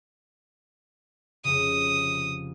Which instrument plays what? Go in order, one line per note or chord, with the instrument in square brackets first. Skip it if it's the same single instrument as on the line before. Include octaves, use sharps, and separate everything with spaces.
[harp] F1 F2 C#3 [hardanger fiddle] D#6